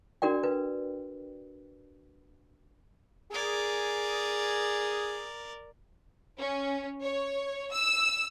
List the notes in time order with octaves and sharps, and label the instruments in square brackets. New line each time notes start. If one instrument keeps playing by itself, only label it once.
[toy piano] D4 F#4 A#4 D5 G5
B4
[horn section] G#4 [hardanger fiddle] A#4 D5
[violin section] C#4
C#5
E6